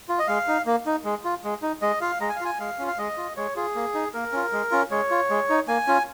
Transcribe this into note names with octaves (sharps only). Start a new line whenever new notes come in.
F4
D#5
G#3 F5
D#4
A#3
D#4
G#3
F4
G#3
D#4
G#3 D#5
F4 F5
G#3 A#5
G#5
F5
F4 G#5
G#3 F5
C#4 F4
F5
G#3 D#5
F4
G#3 C#5
F4 G#4
A#3
D#4
A#3 A#4
C#4 F4
G#3
C#4 F4
G#3 C#5
F4
G#3
D#4
A#3 G#5
C#4 F4